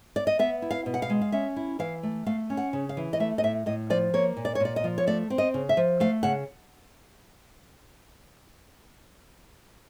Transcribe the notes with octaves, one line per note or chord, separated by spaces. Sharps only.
D5
D#5
B3 E5
E4
F5
B2
F#5
F5
G#3
F5
C#4 E5
E4
E3 F5
A3
A3 F5
C#4
F#5
C#3
F5
E3
D#5
A3 E5
D#5
A2 E5
A2 D#5
F3 D5
A#3 C#5
A#2
D5
C#5
A#2 D5
D#5
F3
C#5
A3 D5
C4
D#5
C#3
E5
F3
A3 F5
C#3 F#5